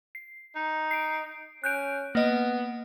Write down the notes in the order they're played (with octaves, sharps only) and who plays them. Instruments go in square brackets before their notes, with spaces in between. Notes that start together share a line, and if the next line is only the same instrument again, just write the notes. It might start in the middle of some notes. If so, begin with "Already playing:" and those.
[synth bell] C7
[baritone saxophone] D#4
[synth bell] C7 D7
[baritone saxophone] C#4 [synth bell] F#6 G6 D7
[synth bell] A#3 D#5 D7 [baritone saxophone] B3